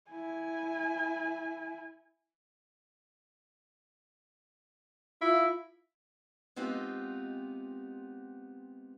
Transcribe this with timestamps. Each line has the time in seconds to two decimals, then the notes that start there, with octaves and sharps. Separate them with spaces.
0.11 E4 G#5
5.22 E4 F4
6.56 G#3 B3 C4 D#4 F4 G4